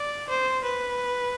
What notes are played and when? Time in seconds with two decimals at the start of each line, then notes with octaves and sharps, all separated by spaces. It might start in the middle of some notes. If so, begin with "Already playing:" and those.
Already playing: D5
0.29 C5
0.64 B4